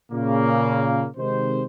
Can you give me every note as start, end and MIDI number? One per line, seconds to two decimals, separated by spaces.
0.12 1.06 46
0.12 1.06 49
0.12 1.06 58
1.17 1.64 48
1.17 1.64 51
1.17 1.64 56
1.17 1.64 72